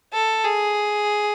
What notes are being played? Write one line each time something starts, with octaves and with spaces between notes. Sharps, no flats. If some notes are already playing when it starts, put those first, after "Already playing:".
A4
G#4